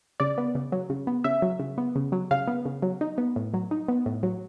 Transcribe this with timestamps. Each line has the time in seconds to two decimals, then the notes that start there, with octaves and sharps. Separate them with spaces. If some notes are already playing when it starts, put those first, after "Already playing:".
0.20 C#3 D5
0.38 B3
0.55 C#3
0.72 F#3
0.90 C#3
1.07 B3
1.24 C#3 E5
1.42 F#3
1.60 C#3
1.78 B3
1.96 C#3
2.12 F#3
2.31 C#3 F5
2.48 B3
2.65 C#3
2.82 F#3
3.01 D#4
3.18 B3
3.36 A2
3.54 F#3
3.71 D#4
3.88 B3
4.06 A2
4.23 F#3